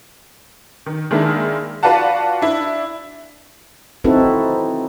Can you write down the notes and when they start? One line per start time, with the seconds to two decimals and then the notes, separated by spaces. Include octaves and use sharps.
0.86 D#3
1.11 D#3 G#3 A#3 D4 E4
1.83 F4 F#4 B4 D5 F#5 A5
2.42 D4 E4
4.04 C4 D#4 E4 F#4 A4 B4